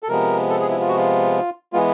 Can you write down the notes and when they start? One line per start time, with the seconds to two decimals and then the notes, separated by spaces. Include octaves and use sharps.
0.03 A4
0.09 C3 F3 G#3 B3 A#4
0.49 A4
0.60 G#4
0.70 E4
0.80 F4
0.88 F#4
0.97 F4
1.73 E3 G#3 B3 F4